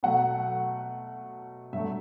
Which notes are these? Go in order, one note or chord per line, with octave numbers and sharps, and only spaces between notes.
B2 F#3 A3 F#5
G2 F#3 A3 E5